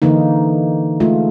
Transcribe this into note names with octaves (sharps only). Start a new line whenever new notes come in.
D3 E3 A#3 D#4
G#3 A3 F4